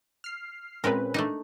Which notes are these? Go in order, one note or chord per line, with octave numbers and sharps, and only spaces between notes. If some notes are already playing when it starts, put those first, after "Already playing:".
F6 C7
A#2 G#3 C4 C#4 A#4 B4
A3 D4 D#4